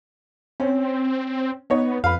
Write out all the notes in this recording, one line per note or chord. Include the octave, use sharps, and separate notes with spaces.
C4 C#4
B3 D#4 C#5
F2 B4 F5